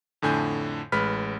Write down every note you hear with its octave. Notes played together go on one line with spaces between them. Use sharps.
F2 A2 D3 G#5 G6
A1 G#3 B4 B5 F6 B6